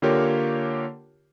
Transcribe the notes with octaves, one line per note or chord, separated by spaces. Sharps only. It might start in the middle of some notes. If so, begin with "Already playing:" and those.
D3 A#3 F4 G4 A#4 C#5